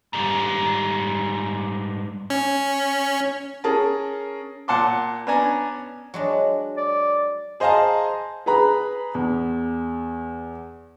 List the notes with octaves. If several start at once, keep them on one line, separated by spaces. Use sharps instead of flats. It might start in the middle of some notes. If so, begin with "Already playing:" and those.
G#2 G3
C#4
C#4 G#4 A#4 A5
A#2 F#5 A5 C6 D6
B3 C#4 D4 G#5 A#5
F#3 G#3 D4
D5
G#4 C5 D#5 F5 A5 A#5
G#4 B4 A#5 B5
E2